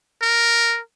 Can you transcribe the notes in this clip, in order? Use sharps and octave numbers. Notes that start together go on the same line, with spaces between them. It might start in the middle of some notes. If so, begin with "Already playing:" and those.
A#4